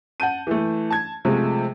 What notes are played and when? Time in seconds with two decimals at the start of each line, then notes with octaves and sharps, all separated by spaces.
0.20 F#5 A5 G6 D#7
0.47 E3 A3
0.90 A5 G#6
1.25 C3 F3 G#3 A3